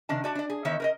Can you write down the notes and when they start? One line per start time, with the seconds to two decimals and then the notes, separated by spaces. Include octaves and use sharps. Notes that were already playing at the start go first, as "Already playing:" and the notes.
0.09 C3 D#3 D4 A5
0.24 F#4 D5 A5
0.35 D4 D5
0.50 G#4
0.65 E2 D#3 D#4 C#5 E5
0.80 A#4 B4 D#5